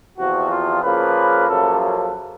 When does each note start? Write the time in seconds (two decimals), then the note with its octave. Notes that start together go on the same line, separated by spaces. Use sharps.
0.18 E2 C3 F3 F#4
0.51 F4
0.83 C#3 F3 A#3 B4
1.48 F#2 C#3 F3 A#3 A4
1.80 A4